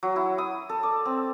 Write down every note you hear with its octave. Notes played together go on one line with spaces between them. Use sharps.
F#3
E4
D#6
A4
D5
C4